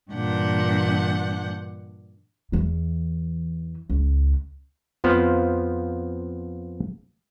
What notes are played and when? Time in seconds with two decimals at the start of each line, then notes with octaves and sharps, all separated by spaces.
0.12 G2 A#2 E3 D4 F#5 G6
2.52 E2 E3
3.90 C#2
5.04 F2 F3 B3 C5 F5